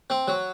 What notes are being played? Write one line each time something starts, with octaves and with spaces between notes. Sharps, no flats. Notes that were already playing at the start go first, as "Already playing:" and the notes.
C4
F#3